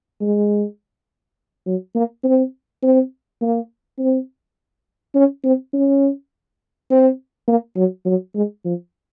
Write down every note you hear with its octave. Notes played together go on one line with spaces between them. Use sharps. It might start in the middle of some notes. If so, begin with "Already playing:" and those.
G#3
F#3
A#3
C4
C4
A#3
C4
C#4
C4
C#4
C4
A#3
F#3
F#3
G#3
F3